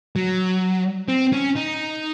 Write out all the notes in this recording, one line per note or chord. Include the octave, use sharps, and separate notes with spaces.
F#3
C4
C#4
D#4